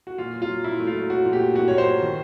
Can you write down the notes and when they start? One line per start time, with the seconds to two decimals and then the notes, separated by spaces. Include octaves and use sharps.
0.07 F#4
0.18 A#2 F4
0.34 F#3
0.42 F4
0.49 F#3
0.64 A#2 E4
0.80 A3
0.87 F4
0.95 F#3
1.10 F#3 F#4
1.26 A#2
1.33 G4
1.40 A#2
1.56 A#2 F#4
1.68 A#2 C#5
1.78 C5
1.86 F#3
2.01 D#3